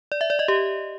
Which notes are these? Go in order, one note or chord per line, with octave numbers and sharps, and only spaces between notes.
D5
E5
D5
D#5
G4